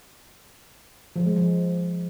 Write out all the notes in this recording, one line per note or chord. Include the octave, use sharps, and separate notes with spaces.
F3
G#3
F3